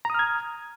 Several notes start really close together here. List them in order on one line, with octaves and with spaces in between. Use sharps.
A#5 D#6 F6 G#6